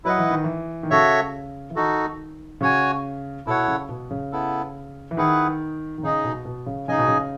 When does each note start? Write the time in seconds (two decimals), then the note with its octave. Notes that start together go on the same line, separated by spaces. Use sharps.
0.04 F#3 E4 B4 D#5 F#5
0.18 E3
0.31 D#3
0.44 E3
0.83 D#3
0.90 C#3 F#4 A4 C#5 E5
1.70 E3
1.75 D#3 D#4 F#4 A4
2.61 C#3 F#4 C#5 G#5
3.47 B2 E4 A4 C#5 F#5
3.68 C#3
3.89 B2
4.11 C#3
4.32 B3 E4 A4
5.11 E3
5.17 D#3 E4 G#4 B4 F#5
5.98 D#3
6.03 C#3 D#4 G#4 D#5
6.24 B2
6.45 B2
6.66 C#3
6.88 C#3 D#4 G#4 D#5 G#5
6.98 B2
7.08 C#3